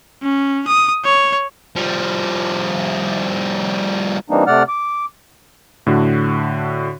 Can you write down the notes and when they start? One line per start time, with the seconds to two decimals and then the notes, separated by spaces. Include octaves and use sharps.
0.22 C#4
0.68 D#6
1.05 C#5
1.76 F3 G3
4.30 E3 G3 A#3 C4 D4 D#4
4.47 C3 A3 D5 F#5 F6
4.68 D6
5.87 A2 D3 F#4